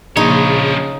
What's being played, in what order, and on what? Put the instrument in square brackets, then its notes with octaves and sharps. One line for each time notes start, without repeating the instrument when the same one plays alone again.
[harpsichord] A#1 [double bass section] C#3 [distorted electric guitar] F3 C#5 [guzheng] D#4